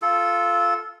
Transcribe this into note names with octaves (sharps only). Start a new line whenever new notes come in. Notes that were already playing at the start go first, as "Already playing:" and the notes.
F4 A4